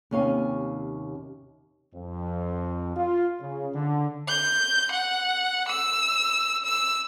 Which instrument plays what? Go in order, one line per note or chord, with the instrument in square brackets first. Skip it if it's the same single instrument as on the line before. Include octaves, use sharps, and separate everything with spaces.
[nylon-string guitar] D#2 C3 C#4 C#5 F5 G#5
[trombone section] F2
F4
C#3
D3
[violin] G6
F#5
E6
E6